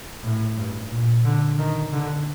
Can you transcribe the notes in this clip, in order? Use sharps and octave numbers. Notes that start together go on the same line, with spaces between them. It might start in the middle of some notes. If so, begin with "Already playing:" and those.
A2
G2
A#2
D3
D#3
D3